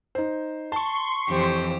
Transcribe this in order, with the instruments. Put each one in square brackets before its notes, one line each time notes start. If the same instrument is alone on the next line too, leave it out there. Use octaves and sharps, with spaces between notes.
[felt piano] D#4 C5
[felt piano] A5 [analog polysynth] C6 C#6
[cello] F2 E3 [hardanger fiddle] G4 C5